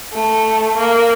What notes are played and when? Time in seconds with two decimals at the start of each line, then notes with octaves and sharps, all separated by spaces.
0.13 A3
0.77 A#3